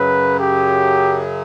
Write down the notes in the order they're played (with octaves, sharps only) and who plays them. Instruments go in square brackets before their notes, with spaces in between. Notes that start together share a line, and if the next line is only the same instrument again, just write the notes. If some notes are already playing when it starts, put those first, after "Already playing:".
Already playing: [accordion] F#2 C#3 F#3 [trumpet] B4
[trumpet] G4